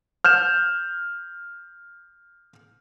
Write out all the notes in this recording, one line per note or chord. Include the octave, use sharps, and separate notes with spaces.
F6 G6 E7